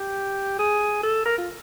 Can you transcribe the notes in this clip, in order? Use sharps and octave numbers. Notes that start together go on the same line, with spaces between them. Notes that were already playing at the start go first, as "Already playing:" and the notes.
Already playing: G4
G#4
A4
A#4
F4